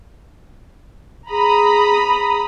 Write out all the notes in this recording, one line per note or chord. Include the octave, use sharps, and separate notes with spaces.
G#4 A#5 B5 D#6